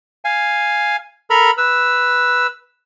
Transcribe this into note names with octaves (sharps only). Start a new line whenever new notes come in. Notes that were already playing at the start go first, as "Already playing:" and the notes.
F5 G#5
A4 A#4 A#5 B5
B4 E6